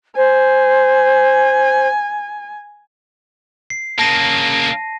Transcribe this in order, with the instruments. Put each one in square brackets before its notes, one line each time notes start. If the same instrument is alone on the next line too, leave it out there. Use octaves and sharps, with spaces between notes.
[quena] C5 [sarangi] G#5
[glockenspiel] C7
[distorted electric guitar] C#3 A#3 [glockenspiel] A5 A#6 D#7